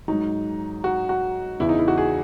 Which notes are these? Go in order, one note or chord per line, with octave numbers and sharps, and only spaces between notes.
G#2 F#3 D#4
F#4
F#4
E2 C#3 E3 E4
D#4
E4
F#4
G#4